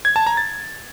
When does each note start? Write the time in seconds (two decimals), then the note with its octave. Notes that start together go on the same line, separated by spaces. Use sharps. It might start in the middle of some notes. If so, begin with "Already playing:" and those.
0.05 G#6
0.16 A5
0.27 A#5
0.37 A6